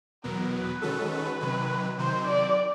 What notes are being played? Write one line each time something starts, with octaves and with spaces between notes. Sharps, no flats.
E2 B2 F#3 B3 A#4
B4
D#3 G#3 C#4 F#4 A4
B4
C3 D#3 F#3
C3 D#3 F#3 C5
D5